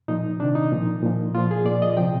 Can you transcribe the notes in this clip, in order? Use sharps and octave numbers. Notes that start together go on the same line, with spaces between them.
A#2 F3 D#4
C3 D#3 D4
D#4
A#2 F3
A#2 F3
A#2 F3 F4
G#4
A#2 F3 D5
D#5
C3 F3 G5